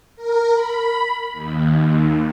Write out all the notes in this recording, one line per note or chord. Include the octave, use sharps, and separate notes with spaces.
A#4
B5
D#2